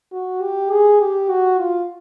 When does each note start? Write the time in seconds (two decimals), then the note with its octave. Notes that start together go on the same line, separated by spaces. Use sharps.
0.12 F#4
0.42 G4
0.71 G#4
1.00 G4
1.29 F#4
1.58 F4